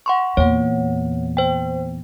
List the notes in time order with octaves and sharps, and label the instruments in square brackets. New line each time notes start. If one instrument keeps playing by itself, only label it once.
[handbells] F#5 C6 C#6
[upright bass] E2 A#2 [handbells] C#5 F#5
[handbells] C5 G5